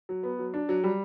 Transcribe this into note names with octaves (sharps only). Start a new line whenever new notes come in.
F#3
B3
F#3
D4
F#3
G3